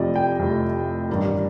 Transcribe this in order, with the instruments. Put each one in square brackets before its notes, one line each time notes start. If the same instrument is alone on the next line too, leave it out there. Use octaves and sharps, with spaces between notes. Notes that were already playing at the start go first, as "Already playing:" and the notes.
Already playing: [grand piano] F1 F2 C3 F3 A3 D5 D#5
G5
F1 F2 C3 F3 A3
A1 G2 D#3 A#3